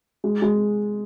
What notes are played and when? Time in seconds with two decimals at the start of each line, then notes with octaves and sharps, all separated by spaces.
0.24 G#3
0.42 G#3